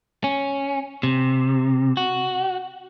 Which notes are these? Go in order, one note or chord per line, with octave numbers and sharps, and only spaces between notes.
C#4
C3
F#4